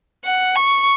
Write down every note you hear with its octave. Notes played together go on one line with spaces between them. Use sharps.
F#5
C#6